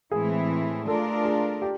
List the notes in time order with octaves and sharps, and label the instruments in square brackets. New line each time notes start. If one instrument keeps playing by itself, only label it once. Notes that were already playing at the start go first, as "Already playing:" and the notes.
[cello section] A2 E3 G#3 C4 E4 [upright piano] G#4
[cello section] A3 D4 F4 A#4 D5 [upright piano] A4
[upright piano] G#4
G4